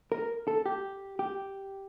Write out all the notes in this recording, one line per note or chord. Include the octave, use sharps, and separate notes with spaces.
A#4
A4
G4
G4